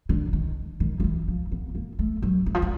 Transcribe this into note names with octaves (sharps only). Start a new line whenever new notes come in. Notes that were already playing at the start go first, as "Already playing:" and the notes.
D3
D#3
D#3
F3
E3
F3
B3
A#3
A3
F#3
E3
F3
E3